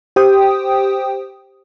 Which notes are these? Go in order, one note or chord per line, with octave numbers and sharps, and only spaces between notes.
G4 C5 G5 D#6